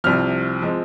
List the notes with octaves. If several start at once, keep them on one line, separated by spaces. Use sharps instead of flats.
C2 C3 F3 F6
F3 G#3 C4